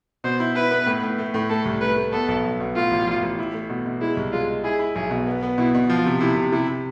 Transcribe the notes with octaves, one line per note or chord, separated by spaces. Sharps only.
B2 C5
E4
E4 B4
B3
A2
A2
A3
A2
A3 A4
C2
A3 B4
A3
B3 A4
B1
B1
B2
A2 F4
A1
A1
A1
E4
A3
B2
B2
G#3 E4
C2
G#3 F4
G#3
E4 G#4
E4
B1 G#4
B2
B3
B3
B2 E4
B2
F3 F4
C3
C3 E4
C3
C3 E4
C3